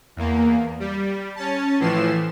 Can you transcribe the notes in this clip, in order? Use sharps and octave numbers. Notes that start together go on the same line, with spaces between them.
E2 A#3
G3
C#4 A5
A2 E3 F3 C7 E7